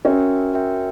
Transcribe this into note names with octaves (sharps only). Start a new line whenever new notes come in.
C#4 F#4 A#4 E5 G5
F#4 A#4 E5 G5